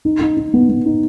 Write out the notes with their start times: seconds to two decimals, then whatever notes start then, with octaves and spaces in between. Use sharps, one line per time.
0.05 D#4
0.21 D#4
0.37 D#4
0.54 B3
0.69 B3
0.85 D#4